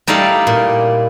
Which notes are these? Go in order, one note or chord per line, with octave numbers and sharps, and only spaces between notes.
G3 D#4 E4 A4 D5 F5
A#2